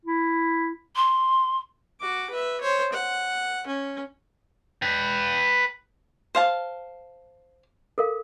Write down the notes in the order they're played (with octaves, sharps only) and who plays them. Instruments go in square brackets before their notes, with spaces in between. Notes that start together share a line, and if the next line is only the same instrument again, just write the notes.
[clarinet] E4
[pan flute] C6
[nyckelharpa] F#4 D6
B4 E5
C5 C#5
F#5
C#4
[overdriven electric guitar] B4 G5
[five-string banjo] C5 F5 A5
[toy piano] A4 A#4 F5